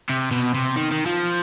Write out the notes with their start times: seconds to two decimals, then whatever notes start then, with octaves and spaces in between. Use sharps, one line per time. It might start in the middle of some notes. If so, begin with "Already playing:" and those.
0.09 C3
0.31 B2
0.54 C3
0.76 D#3
0.92 D#3
1.06 F3